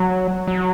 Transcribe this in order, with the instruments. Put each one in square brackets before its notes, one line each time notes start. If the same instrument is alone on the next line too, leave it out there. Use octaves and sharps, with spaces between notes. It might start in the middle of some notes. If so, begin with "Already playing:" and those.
Already playing: [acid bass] F#3
F#3